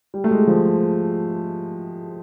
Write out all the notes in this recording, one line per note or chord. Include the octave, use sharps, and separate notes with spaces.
G3
A3
G#3
F3